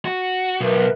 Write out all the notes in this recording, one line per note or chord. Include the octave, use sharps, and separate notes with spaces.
F#4
B1 A#4 B4 E5